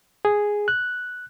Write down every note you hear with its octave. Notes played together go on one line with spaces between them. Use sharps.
G#4
F#6